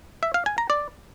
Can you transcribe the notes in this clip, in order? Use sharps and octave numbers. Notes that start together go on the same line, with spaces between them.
E5
F5
G#5
A#5
D5